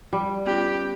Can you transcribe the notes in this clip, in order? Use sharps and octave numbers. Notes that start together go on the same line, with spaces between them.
G3
B3 C#4 F4 G4